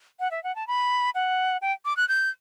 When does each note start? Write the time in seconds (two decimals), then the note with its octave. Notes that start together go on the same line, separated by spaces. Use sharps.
0.20 F#5
0.31 E5
0.44 F#5
0.55 A5
0.67 B5
1.15 F#5
1.62 G5
1.85 D6
1.97 F#6
2.08 G6